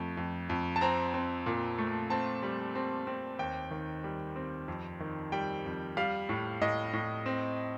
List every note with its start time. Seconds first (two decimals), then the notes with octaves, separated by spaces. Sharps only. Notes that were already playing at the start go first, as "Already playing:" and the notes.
Already playing: F2 A3
0.17 F2
0.50 F2
0.76 A5
0.81 C4 A#5
1.14 C4
1.46 A#2
1.78 A3
2.10 C4 A5
2.43 G3
2.75 C4
3.07 C4
3.39 D#2 G5
3.71 D#3
4.04 G3
4.36 C4
4.68 F2
5.00 D#3
5.32 G3 G5
5.65 F2
5.97 G3 F5
6.29 A2
6.61 A2 D#5
6.93 A2
7.26 C4